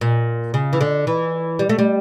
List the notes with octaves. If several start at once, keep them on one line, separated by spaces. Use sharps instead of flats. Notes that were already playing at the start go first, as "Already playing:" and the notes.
A#2
C#3
E3
D3
E3
G3
A3
G3